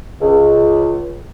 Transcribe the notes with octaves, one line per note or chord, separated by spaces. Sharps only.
C#2